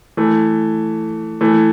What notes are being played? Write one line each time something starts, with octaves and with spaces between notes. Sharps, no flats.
E3 A3
E3 A3